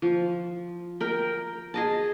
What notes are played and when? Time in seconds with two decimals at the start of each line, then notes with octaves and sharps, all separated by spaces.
0.02 F3
1.00 A#4 G5
1.74 G#4 D#5 A5